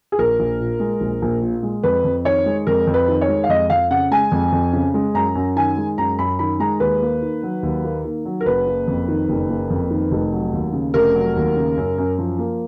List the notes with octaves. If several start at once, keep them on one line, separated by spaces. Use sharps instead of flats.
G#4
A#1 A#4
A#1
A#2
G#3
A#1
A#1
A#2
G#3
F2 B4
F2
D#3 C#5
G#3
F2 A#4
F2
B4
D#3
C#5
G#3
F5
F2 D#5
F2 F5
C#3 F#5
G#3 G#5
F2
F2
C#3
G#3
F#2 A#5
F#2
D#3 G#5
G#3
F#2 A#5
F#2 B5
D#3 B5
G#3 A#5
D#2 B4
A#3
D#3
F#3
D#2
A#3
D#3
F#3
A#4
F#1 B4
A#3
F2
D#3
F#1
A#3
F2
D#3
F1
F#3
D#2
C#3
F1 A#4
F#3
D#2
C#3
F#2
F#2
F3
A#3